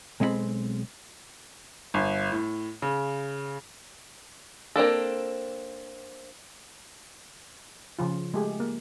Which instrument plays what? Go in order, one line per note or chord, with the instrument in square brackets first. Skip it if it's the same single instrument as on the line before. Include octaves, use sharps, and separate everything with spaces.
[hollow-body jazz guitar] B1 G#3 C4 D#5 B5
[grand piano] G1
A2
C#3
[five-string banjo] A#3 C4 D4 A4
[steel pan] C#3 F3 F4
G#3 A3 G4 G#4
A#3